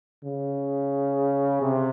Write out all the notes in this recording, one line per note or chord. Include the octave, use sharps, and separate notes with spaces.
C#3
C3